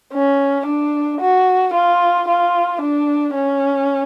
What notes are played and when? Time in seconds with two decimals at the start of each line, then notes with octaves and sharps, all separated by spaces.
0.13 C#4
0.66 D4
1.21 F#4
1.74 F4
2.28 F4
2.81 D4
3.35 C#4